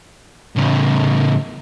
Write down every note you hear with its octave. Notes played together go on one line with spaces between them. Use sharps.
A2 C#3